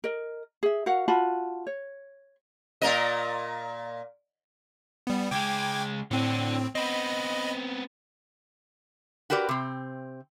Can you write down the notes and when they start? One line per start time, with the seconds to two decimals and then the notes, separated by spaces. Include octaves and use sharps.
0.04 A#4 D#5
0.63 G#4 E5
0.86 F#4 A#4 F5 F#5
1.08 F4 F#4 A5 B5
1.67 C#5
2.81 A#2 A#4 D#5
5.07 G3 B3
5.31 C#2 G#3 G5 D6 G#6
6.11 A2 D3 C4 D4
6.75 B3 C4 D#5 B5
9.30 F#4 G4 A#4 B4 D5
9.49 C3 C4